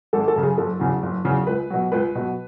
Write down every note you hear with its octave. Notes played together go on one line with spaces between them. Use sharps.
G#1 A4
A4
F#2 C#3
G#4
F#1 A4
E2 C#3 F#3
F#1
E2 C#3 F#3
C#2 B4
B2 F#3
C#2 B4
B2 F#3